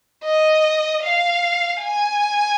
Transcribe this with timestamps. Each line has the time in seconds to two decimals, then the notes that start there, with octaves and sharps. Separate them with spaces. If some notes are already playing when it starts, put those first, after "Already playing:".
0.24 D#5
1.03 F5
1.82 G#5